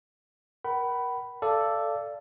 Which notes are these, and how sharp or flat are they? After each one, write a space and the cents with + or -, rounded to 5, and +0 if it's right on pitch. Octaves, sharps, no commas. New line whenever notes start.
A#4 +25 F#5 +45 B5 +0
A4 +5 D5 +0 F5 -25